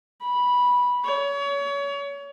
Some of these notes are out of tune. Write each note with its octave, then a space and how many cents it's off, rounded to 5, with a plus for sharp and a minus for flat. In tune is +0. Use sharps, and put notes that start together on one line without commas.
B5 -10
C#5 +30